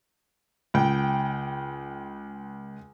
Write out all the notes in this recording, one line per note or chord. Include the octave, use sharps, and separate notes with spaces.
C#2 G5